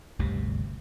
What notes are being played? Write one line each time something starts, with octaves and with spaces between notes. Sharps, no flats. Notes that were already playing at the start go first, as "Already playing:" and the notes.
G1 D2 C3